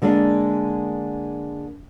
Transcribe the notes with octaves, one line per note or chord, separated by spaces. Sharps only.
D3 G#3 A#3 D4